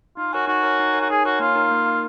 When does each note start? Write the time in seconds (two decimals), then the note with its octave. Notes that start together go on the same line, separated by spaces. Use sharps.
0.17 D#4 F4
0.33 F#4 A#4 C#5 G#5
0.47 D#4 F#4
0.63 A#4 C#5 G#5
0.79 D#4
0.93 A#4 C#5 G#5
1.01 F#4
1.10 D#4 G#4
1.25 F#4 A#4 C#5 G#5
1.39 A#3 F4
1.56 D#4 A#4
1.71 A#3
1.85 D#4 A#4